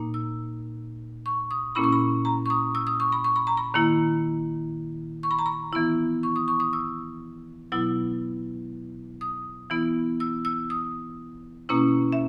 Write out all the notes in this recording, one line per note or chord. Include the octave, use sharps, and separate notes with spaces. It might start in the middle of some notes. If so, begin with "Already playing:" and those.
Already playing: A#2 A#3 D#4
E6
C#6
D#6
A#2 A#3 C#4 E4 B5
C#6
B5
A#5
C#6
D#6
E6
D#6
C#6
B5
C#6
B5
A#5
B5
D#3 A#3 E4
C#6
B5
A#5
B5
E3 B3 E4
C#6
D#6
C#6
D#6
E6
B2 F#3 B3 E4 E6
D#6
E3 B3 E4
E6
E6
D#6
B2 A#3 C#4 E4
E5